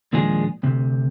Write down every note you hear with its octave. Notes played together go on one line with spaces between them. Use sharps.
D#2 A#2 F3 G#3 D4 G#4
D2 C3